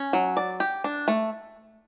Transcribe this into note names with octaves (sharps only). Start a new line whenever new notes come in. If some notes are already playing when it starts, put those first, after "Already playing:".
Already playing: C#4
F#3
D5
G4
D4
A3